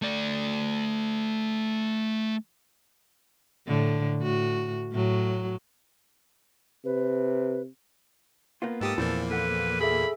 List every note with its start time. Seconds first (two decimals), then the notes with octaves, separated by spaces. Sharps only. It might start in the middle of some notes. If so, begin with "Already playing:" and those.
0.02 A3 D5
3.67 A2 D3
4.20 A2 F#4
4.92 A2 F#3
6.85 C3 B4
8.62 A#3 B3 F4
8.81 G#2 G4 A4 D#6
8.98 E2 A#2 F3 A#3 C4 E4 F4
9.31 A4 B4 F#5
9.80 G#4 A4 E5 B5